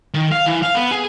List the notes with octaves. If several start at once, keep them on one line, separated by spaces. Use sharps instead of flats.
D#3
F5
E3
F5
B3
G#4